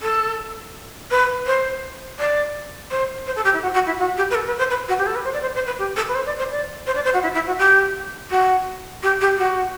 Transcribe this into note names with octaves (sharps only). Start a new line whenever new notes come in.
A4
B4
C5
D5
C5
C5
A4
G4
E4
F#4
F#4
E4
F#4
G4
B4
A4
B4
C5
B4
F#4
G4
A4
B4
C5
D5
C5
C5
B4
G4
A4
B4
C5
D5
C5
D5
C5
D5
C5
F#4
E4
E4
F#4
G4
F#4
G4
G4
F#4